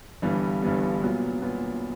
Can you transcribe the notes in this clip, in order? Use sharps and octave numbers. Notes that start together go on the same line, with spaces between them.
G1 G2 E3 G3 B3
G1 G2 E3 G3 B3
A#2 F#3 B3
A#2 F#3 B3